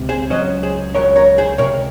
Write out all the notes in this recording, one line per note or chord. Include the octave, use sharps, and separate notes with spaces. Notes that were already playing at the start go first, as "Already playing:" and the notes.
Already playing: C#2 C3
G#4 C5
C#2 C#3 F#3 C#4 C5 D#5
G#4 C5
C#2 C#3 F#3 C#4 A#4 C#5
A#4 C#5
G#4 C5
C#2 C3 A#4 C#5